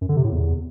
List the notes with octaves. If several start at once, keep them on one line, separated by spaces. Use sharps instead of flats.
F#2
D3
C3
A2
E2